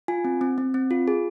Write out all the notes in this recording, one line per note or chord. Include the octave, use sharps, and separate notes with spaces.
F4 G#5
C4
C4
C4
C4
F4
G#4